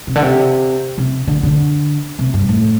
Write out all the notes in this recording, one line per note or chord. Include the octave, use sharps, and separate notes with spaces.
C3
D3
C3
C3
D3
D3
C3
G2
A2